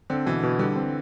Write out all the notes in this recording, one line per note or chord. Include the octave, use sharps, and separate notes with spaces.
D3 C4
B2 E3
B2
D3 G3
C4